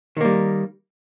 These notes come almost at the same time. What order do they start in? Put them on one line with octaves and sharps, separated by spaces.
D#3 A#3 G3